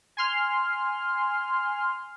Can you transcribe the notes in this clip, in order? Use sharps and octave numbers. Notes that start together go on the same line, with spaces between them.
G#5 C6 F6